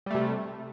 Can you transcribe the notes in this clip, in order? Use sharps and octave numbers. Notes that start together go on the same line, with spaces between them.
C3 G3 A3